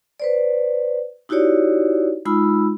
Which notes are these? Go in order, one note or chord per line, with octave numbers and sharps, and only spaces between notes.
B4 C5 D5
D#4 E4 F#4 G4 C#5 D5
G#3 D#4 F4 B5 E6